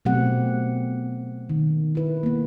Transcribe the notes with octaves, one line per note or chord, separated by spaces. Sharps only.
B2 F#3 A3 C4 G4 F#5
D#3
E4 B4
A#3 B3